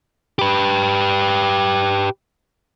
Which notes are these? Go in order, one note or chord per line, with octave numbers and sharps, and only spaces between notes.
G4 B4